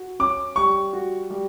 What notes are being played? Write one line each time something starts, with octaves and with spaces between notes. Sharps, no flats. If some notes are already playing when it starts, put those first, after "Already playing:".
Already playing: F#4
C#4 D6
G3 C#6
F#4
G3